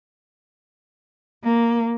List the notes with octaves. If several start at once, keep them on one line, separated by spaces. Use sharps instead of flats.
A#3